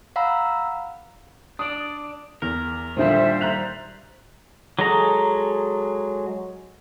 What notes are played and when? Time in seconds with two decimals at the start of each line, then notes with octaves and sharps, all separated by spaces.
0.16 F5 F#5 A#5 B5 E6
1.59 D4 D5 D#6
2.42 E2 A#4
2.97 A#2 D3 D#3 F3 G3 C5 E5
3.41 A#5 F#6 F7
4.79 F#3 G#3 G#4 A4 A#5